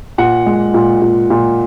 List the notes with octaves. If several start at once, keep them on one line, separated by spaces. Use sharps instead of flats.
A#2 F#5
G#3
A#2
A#2
A#2